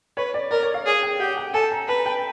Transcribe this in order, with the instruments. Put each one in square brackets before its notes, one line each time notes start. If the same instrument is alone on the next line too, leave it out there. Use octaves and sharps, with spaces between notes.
[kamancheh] B4 [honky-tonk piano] C#5
[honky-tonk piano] D5
[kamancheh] A#4 [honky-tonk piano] D5
[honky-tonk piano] C#5
F5
[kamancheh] G#4
[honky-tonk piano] G5
[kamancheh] G4 [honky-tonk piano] F#5
[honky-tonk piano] G5
[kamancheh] A4 [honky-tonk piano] G#5
[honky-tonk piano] A#5
[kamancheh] B4 [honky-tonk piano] A5
[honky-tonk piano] G5